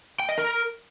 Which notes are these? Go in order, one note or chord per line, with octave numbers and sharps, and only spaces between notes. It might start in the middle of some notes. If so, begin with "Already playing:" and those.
G5
D#5
A#4